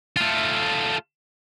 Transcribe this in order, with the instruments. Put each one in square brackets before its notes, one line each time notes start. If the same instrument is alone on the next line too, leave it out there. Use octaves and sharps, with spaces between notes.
[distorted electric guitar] A3 F4